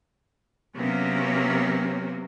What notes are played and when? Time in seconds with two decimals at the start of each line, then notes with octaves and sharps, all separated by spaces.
0.76 C3 F#3 A#3 B3 C#4